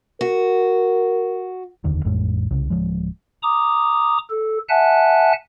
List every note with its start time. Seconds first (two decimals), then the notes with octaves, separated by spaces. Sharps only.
0.21 F#4 A#4
1.84 F1 D#2 D3 D#3
2.05 A1 F2 A2 G#3
2.51 C2 C#3
2.70 D1 C#2 F3 G#3
3.43 A#5 D6 D#6
4.30 A4
4.69 E5 F#5 G#5 A5 F#6